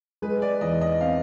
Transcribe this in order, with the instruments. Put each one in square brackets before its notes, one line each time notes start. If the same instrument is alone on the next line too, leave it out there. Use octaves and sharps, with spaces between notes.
[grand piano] G#3 [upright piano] B4
[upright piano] D5
[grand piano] E2 [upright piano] D#5
[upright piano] D#5
[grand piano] C4 [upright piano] F5